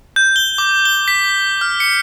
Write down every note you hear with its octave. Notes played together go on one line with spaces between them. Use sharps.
G6
G7
D6
G7
B6
F6
C#7